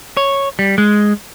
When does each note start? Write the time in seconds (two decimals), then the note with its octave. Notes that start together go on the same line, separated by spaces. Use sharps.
0.17 C#5
0.59 G3
0.78 G#3